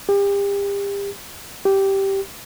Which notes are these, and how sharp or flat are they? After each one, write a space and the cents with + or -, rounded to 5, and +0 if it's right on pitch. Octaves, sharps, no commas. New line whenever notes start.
G4 +35
G4 -10